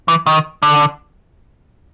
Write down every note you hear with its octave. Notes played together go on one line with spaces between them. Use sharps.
E3
D#3
D3